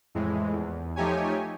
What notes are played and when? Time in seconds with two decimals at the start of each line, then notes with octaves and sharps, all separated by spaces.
0.15 F2 A2 E3 G#3
0.53 E2
0.96 F3 A3 D#4 G4 C#5 G#5